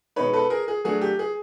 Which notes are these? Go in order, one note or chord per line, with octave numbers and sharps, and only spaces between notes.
B2 G#3 B3 D#4 B4 C#5
A4 B4
G#4 A#4
G#4
F#3 A3 D4 G#4
G4
G#4